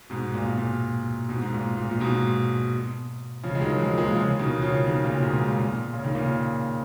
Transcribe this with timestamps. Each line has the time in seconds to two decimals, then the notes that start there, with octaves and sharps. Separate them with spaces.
0.10 G#2 B2
0.34 A#2
0.47 B2
0.57 A#2
1.29 G#2 B2
1.42 G#2
1.52 A#2
1.77 A#2
1.90 A#2
2.00 G#2 B2
3.43 C#3 F3
3.55 G#3
3.61 D#3 F#3
3.79 F3 G#3
3.92 A#3
3.98 F3 G#3
4.15 C#3 F3
4.39 B2 D#3
4.62 C#3 F3
4.86 B2 D#3
5.04 A#2 C#3
5.22 G#2 B2
5.33 G#2
5.40 A#2
5.58 A#2
5.94 C#3
6.04 D#3
6.15 A#2 C#3